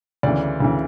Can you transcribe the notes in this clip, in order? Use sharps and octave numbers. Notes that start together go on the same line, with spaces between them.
D2 C#3 E3 D5
D2 C#3 E3